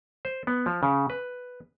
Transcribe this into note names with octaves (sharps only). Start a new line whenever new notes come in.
C5
B3
F3
C#3
B4